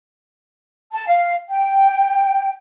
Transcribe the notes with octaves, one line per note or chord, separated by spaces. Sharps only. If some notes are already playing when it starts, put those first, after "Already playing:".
A5
F5
G5